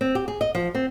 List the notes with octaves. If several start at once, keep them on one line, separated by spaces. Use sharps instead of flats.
C4
G4
G#4
D#5
F3
C4